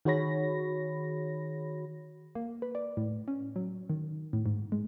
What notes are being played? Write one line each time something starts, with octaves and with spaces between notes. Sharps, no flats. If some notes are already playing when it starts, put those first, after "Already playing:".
D#3 F#4 G#4 C#5 B5 A#6
A#3
B4
D5
A2
C#4
F#3
D#3
A2
G#2
G#3